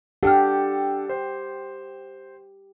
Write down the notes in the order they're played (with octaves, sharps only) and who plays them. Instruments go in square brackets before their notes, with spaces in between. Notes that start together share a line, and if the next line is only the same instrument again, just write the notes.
[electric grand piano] D4 A4 [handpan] G4 [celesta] F#5 F6
[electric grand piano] C5